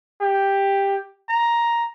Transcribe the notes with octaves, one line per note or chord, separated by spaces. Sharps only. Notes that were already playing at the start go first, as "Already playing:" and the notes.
G4
A#5